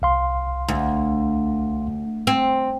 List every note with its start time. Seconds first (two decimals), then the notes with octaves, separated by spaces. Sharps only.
0.02 C2 F5 C6
0.68 D2
2.27 C4